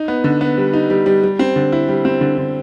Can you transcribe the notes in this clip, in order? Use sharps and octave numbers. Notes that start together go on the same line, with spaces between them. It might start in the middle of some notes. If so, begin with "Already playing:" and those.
Already playing: D#4
B3
D3
B3
G3
D#4
G3
G3
G3
C4
D3
E4
G3
C4
D3
D3